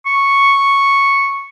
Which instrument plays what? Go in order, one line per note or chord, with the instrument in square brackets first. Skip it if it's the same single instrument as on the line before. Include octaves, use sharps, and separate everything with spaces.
[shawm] C#6